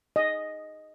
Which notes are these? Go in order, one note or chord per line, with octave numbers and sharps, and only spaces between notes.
D#5